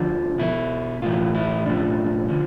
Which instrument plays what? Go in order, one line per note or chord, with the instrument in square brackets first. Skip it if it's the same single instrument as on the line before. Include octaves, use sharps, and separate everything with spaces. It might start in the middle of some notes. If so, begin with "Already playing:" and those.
Already playing: [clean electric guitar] D2 D3 F3 D4
B1 B2 E4
B1 A2 E3 F4
E4
B1 A2 F3 D4
D3 F3